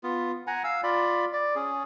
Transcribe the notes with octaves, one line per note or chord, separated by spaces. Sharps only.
B3 F4
F#5 G#5 A#5
F5 E6
F4 D5 B5
D5
C#4 G#4